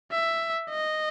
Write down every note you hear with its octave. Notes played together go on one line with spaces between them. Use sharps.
E5
D#5